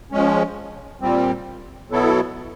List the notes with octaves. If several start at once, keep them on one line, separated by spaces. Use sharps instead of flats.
F3 G#3 C#4
A#2 G3 C4
B2 F#3 B3 E4 A4